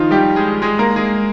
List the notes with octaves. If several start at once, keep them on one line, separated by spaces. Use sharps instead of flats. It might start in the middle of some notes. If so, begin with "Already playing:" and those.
Already playing: D#3 F3 D#4 F4
G3 G4
G#3 G#4
G#3 G#4
A#3 A#4
G#3 G#4